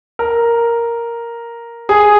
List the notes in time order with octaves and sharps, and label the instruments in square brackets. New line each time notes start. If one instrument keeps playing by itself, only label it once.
[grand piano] A#4
G#4